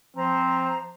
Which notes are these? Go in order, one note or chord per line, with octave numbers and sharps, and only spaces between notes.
F3 C4 C5 A#5